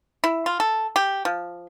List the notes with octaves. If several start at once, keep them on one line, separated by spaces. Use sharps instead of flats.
E4
F4
A4
G4
F3